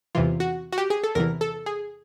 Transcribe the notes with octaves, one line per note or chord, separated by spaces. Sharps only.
E2 C3 E3 F4
F#4
F#4
G4
G#4
A4
E2 C3 E3 A#4
A4
G#4